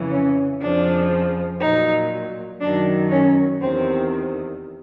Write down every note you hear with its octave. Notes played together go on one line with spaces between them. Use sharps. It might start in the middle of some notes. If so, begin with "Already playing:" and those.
Already playing: F2 C#3 E3
C#4
F2 C#3 F3 D4
A#2 F#3 D#4
F#2 D#3 F#3 D4
C#4
E2 C3 D#3 C4